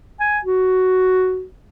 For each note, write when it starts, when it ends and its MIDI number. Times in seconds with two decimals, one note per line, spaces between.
0.20 0.39 80
0.45 1.44 66